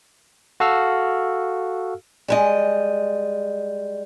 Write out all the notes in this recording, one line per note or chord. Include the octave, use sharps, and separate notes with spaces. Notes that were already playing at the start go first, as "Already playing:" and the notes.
F#4 A4 F5 E6 F6
G3 G#3 D#5